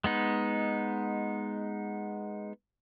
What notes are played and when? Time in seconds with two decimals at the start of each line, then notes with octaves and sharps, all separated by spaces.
0.04 G#3 B3 D#4